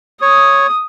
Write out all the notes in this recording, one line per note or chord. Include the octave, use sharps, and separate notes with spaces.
C#5 D#6